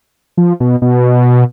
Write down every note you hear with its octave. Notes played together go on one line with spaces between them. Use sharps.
F3
B2
B2